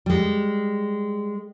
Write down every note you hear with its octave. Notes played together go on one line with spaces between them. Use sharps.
G3 G#3